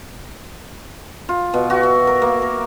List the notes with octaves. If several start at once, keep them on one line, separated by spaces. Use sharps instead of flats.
F4
B2
F#4
E5
A#4
A#3
A#4